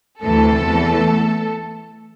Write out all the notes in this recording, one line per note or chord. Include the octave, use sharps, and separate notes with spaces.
D2 C3 E3 A3 A4
E2 E3